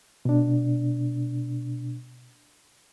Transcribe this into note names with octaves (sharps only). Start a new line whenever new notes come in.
B2 D4